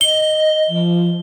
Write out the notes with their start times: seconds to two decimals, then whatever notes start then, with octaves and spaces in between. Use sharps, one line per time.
0.01 D#5 G7
0.69 F3